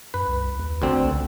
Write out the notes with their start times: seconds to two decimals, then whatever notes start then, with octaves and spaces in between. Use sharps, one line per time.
0.14 F#2 B4
0.27 C2
0.58 D#2
0.82 A1 D2 D3 C4
1.03 C#2